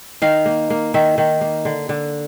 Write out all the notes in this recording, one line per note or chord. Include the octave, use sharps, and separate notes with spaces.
D#3 F5
A#3
A#3
D#3 E5
D#3
A#3
D3
D3